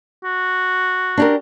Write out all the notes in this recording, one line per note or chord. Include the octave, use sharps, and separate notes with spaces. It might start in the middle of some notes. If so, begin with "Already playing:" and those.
F#4
D4 G4 A#4